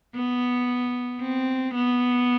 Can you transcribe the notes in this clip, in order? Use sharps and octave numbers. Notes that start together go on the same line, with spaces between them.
B3
C4
B3